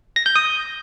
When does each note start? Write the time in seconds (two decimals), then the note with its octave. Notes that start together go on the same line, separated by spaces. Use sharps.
0.16 A#6
0.26 G6
0.36 D#6